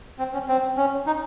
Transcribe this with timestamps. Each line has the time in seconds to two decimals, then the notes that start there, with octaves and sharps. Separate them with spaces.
0.19 C4
0.34 C#4
0.48 C4
0.77 C#4
1.07 D#4